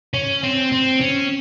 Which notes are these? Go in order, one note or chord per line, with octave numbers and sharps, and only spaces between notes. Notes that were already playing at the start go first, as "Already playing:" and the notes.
C#4
C4
C4
C#4